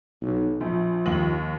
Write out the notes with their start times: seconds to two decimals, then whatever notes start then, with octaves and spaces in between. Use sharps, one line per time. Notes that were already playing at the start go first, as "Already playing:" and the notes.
0.22 B1
0.61 A#1 F3
1.06 D#2 F#7